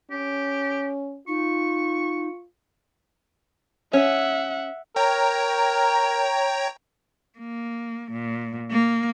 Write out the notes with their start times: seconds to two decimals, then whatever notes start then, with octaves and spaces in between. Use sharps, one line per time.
0.11 C#4 G4
1.28 D#4 F4 C#6
3.93 C#4 E5 F#5
4.96 A#4 C#5 G5 A#5
7.39 A#3
8.11 A#2
8.71 A#3